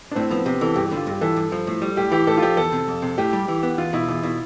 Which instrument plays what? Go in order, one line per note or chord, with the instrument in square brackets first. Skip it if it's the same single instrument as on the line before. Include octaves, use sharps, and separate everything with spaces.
[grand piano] D4
[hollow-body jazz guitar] A2 [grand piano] C4
[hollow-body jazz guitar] F3 [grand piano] B3
[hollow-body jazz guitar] C3 [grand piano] G4
[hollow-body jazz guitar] E3 [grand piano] A4
[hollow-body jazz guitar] G2 [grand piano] G4
[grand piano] G4
[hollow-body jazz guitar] D3 [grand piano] F4
[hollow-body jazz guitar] G2 [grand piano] G4
[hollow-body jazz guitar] E3 [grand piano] A4
[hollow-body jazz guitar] G2
F3
A2
G3
[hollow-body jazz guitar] A2 [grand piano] G4
[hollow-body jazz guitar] E3 [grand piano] G4
[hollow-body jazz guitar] A2 [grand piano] A4
[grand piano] F4
[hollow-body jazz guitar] F3 [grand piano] G4
[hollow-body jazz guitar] E2 [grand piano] A4
[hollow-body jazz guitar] C3
F2
C3
[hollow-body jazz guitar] A2 [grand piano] G4
[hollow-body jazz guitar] G3
E3
B3
[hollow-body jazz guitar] E2 [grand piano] F4
[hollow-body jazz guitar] B2 [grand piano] E4
[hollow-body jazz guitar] E2 [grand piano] E4
[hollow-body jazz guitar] B2 [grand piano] E4